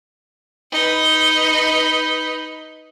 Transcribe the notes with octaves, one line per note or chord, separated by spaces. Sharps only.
D#4 B4